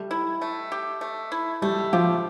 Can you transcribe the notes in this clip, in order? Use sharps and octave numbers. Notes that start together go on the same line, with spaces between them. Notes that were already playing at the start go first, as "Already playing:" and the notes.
Already playing: G3 A3
E4
A3
G4
A3
E4
G3 A3
F3 G4